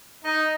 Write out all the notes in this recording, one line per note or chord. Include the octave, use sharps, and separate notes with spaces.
D#4